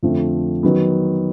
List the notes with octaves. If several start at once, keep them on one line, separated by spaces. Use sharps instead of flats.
F2 D3 F3 A3 C4
D#3 F#3 B3